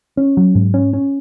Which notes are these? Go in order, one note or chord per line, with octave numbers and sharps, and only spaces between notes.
C#4
F#3
G#2
C#4
C#4